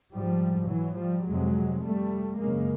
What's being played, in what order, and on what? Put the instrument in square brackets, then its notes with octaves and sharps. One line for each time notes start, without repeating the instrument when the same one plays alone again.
[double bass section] G#2 F3 G3
E3 F#3
F3 G3
F2 C3 F#3 G#3
G3 A3
F#2 C#3 G#3 A#3